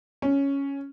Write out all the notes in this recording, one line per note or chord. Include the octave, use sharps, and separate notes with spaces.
C#4